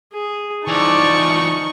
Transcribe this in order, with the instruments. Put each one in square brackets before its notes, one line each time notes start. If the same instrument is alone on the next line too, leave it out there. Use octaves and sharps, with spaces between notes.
[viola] G#4
[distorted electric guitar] E3 F3 [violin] D#4 C#6 [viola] D5 A5